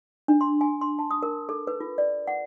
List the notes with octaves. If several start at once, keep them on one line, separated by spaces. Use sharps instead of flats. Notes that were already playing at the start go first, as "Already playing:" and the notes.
D4
C6
G#5
C6
A5
D#6
A#4
A4
B4
F4
D5
F#5